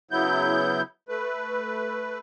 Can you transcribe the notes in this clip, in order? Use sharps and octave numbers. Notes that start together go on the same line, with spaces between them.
C#3 F#3 B3 E4 G6
A3 B4